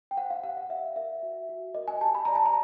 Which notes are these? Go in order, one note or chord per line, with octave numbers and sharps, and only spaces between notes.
G5
C5 F#5
F5
G4 F#5
F5
D5 E5
A#4 E5
F#4
F#4
A#4 D#5
G#5
G4 A5
B5
D5 A#5
A5
A#5